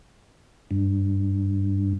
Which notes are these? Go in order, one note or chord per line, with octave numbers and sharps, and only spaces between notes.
G2